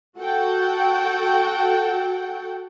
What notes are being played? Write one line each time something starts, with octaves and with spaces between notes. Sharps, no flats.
F#4 A4 F#5 G5